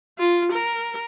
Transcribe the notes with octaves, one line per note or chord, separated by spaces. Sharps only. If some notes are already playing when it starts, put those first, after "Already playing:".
F4
A#4